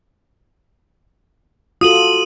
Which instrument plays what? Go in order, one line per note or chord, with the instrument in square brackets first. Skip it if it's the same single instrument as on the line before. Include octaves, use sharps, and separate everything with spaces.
[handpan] F4 F#4 A4 [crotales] D#6 D#7 F#7